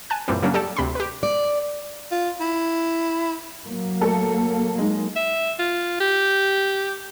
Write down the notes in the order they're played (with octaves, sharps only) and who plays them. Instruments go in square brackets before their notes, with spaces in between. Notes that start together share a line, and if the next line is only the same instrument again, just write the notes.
[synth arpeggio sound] G#5 A5 F#6
F#2 A#2 E3 G3 C4
C#3 F#3 G3 A#3 C#4 D4
G4 A4 D5 G5 A5
D2 C3 B5 C6
G4 B4
[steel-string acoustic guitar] D5
[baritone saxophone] F4
E4
[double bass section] F#3 A#3
[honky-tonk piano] A3 A4 A#4
G#3 D#4
[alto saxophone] E5
F4
G4